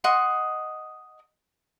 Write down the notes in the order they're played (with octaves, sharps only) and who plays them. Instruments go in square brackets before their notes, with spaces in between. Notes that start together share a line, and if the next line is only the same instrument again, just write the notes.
[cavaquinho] D#5 F#5 C6 C#6